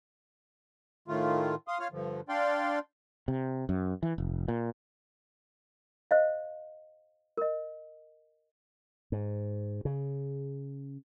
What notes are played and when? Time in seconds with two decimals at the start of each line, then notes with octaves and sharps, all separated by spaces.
1.08 A2 D#3 A3 F4
1.68 F5 C6 D#6
1.80 F4 C#5 F5 F6
1.92 G2 D3 F3
2.29 D4 D5 F5 G5 C6
3.28 C3
3.69 F#2
4.03 E3
4.18 F1
4.48 A#2
6.11 C5 D#5 F5
7.37 A#4 D#5
9.12 G#2
9.85 C#3